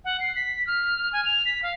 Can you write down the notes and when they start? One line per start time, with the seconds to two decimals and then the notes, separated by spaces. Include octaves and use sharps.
0.05 F#5
0.20 C7
0.36 B6
0.67 F6
1.13 G#5
1.25 F7
1.46 B6
1.63 F5